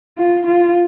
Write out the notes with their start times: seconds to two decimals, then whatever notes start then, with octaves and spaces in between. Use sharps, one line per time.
0.18 F4
0.47 F4